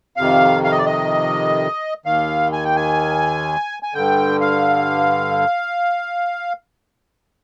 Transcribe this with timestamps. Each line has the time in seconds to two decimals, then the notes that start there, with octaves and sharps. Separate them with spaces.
0.17 F2 C3 D#3 F5
0.64 F5
0.71 D#5
0.78 D5
0.86 D#5
2.06 D#2 D#3 F5
2.53 G#5
2.65 G5
2.76 G#5
3.83 G#5
3.94 G2 D3 G5
4.41 F5